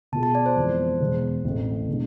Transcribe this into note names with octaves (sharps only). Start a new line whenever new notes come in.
B2 B3 F4 G#4 A5
A5
D5
C5
F2 E3 G#3 B3
E2 B2 G#3
A1 A2 E3 A3 C4
B2 G#3 D4